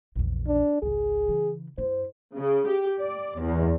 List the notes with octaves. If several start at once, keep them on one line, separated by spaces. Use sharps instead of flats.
A#1 E2
D4
G#1 C#2 G#4
C#3 E3
G2 E4 C5
C#3
G4
D5
E2